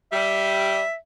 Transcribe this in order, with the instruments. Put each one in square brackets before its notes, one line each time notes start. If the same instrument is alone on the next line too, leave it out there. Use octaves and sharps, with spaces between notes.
[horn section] G3 [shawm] E5